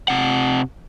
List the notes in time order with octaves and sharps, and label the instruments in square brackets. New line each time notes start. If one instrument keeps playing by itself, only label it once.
[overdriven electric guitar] C3 F#5